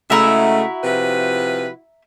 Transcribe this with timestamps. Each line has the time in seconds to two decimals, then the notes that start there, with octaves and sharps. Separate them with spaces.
0.10 C#3 G#3 A3 E4 F#4 E5 A#5 E6
0.84 C3 F3 B4